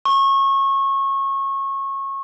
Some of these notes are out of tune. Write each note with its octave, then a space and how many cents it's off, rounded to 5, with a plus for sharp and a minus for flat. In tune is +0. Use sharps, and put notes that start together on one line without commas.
C#6 -25